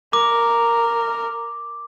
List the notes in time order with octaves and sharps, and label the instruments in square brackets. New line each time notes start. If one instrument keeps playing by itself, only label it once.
[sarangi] A#4 [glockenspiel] D6